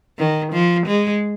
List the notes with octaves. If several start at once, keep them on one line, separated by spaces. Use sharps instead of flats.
D#3
F3
G#3